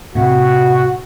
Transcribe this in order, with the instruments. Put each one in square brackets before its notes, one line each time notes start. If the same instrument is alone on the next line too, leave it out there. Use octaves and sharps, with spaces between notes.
[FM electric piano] A2 C3 [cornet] F#4